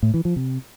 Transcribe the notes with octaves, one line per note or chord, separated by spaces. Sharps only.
A2
E3
F3
C3